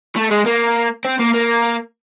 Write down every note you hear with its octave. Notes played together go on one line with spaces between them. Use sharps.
A3
G#3
A#3
C4
A#3
A#3